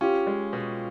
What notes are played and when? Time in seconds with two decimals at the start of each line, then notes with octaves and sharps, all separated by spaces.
0.01 C#4 F4 G4
0.27 G#3
0.53 B2